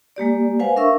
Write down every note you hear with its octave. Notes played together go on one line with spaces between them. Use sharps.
G#3 A#3 G4 D5
B4 C5 F5 F#5 G#5
D4 A#4 E5 F5 C#6 E6